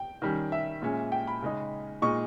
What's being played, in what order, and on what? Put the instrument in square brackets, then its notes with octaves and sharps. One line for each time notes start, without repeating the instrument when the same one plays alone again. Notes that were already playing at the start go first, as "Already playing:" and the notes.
Already playing: [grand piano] G5
D#3 G3 C#4
E5
A#2 G#3 C#4
G5
B5
C#3 G#3 D#4
A#2 G#3 D#4 C#6